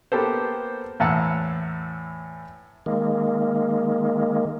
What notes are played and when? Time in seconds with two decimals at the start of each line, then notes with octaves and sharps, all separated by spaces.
0.12 A#3 B3 G4 A4 C5
1.00 E2 A2 F#5 A5 A#5 E6
2.86 D#3 G#3 A#3